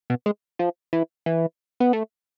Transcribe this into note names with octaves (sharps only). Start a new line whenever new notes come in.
B2
G#3
F3
E3
E3
B3
A3